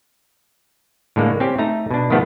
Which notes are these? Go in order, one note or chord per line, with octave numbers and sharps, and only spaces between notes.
A2 D3 G#3 A#3
C4 C#4 G4
A3 D#4 A#5
B2 D4
D#3 F3 A3 B3 F4 G4